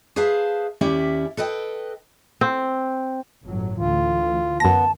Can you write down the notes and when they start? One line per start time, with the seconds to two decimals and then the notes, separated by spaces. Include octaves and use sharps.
0.16 G#4 B4 C5 E5 F5 A5
0.81 D#2 C#4 E4 G4 D5 E5
1.37 A4 B4 D#5 G5
2.41 C4
3.43 G1 A2 F#3
3.78 D2 E3 F4
4.60 F#2 B3 A5 A#6